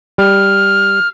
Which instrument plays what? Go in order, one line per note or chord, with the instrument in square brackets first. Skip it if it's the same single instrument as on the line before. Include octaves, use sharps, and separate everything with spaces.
[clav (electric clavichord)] G3 [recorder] F6